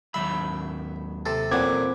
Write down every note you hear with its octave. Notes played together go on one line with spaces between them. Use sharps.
D#2 F#3 E5 B5
C3 A4
A1 A#2 C4 F#5 D6 G#6